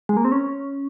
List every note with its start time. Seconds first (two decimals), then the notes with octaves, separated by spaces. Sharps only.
0.09 G#3
0.17 A#3
0.25 C4
0.32 C#4